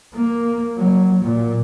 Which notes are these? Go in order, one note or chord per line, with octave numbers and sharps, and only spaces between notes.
A#3
F#3
A#2